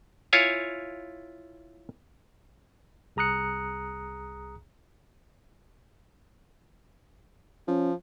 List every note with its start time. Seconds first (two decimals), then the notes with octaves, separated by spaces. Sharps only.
0.33 E4 F4 C#5 F5 G#5
3.16 C2 G#4 A#5 D#6 F#6 C#7
7.68 F3 C#4